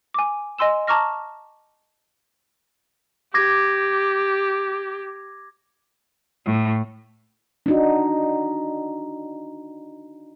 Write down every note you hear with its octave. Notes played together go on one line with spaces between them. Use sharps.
G#5 D6
D#5 G#5 C6 E6 E7
A5 A#5 C#6 D6 F6 A#6
G4 D6 G#6 A#6
A2
D4 D#4 F#4